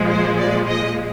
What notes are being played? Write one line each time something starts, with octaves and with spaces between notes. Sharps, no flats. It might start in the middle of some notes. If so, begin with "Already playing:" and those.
Already playing: A#2 F3 G#3
C5
D5
D#5